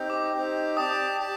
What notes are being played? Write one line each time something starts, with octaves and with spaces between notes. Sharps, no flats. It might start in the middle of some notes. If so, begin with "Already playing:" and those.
Already playing: C4 D#4 G4
D6
C4 D#4 G4
G4 D5 A5 D#6
G4 D5 A5